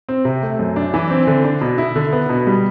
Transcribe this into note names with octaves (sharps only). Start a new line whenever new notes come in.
C4
C3
A3
F#2
D4
E3
C4
D3
D4
B2
E4
D3
B3
B2
G3